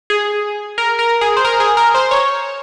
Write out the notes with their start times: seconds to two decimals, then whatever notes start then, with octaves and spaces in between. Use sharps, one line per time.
0.10 G#4
0.78 A#4
0.99 A#4
1.21 G#4
1.37 C5
1.45 A#4
1.60 G#4
1.77 A#4
1.94 C5
2.11 C#5